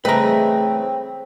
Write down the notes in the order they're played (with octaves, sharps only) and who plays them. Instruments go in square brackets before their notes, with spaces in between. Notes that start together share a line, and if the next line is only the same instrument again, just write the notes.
[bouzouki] C#3 E3 G#4 [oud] A3 D#5 [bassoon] C4 [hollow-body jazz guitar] B4 A#5